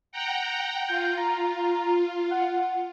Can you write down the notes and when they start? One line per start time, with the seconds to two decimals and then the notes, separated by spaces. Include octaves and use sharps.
0.12 F#5 G5 A#5
0.88 F4 G6
1.18 A#5
2.31 F#5